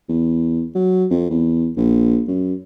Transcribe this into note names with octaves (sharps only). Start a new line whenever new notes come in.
E2
F#3
F2
E2
A#1
F#2